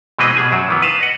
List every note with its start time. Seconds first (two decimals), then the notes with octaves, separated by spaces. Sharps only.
0.19 B2 E3 G#3 C4 B4 D#5
0.37 B2 G3 G#4 G#5
0.52 F#2 F#3
0.69 D#3 E3 B3
0.82 B4 F5 A5
1.01 D#5 F#5